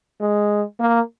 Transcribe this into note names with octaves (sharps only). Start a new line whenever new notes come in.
G#3
A#3